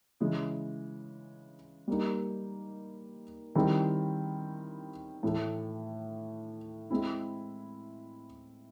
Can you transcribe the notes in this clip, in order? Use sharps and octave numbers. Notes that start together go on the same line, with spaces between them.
C#3 E3 G#3
G3 A#3 D#4
D#3 G3 C4 E4 G#4
A2 E3 A3
G#3 C4 E4